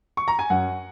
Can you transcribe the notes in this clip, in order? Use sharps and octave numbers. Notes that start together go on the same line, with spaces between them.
C#6
A#5
G#5
F#2 F#5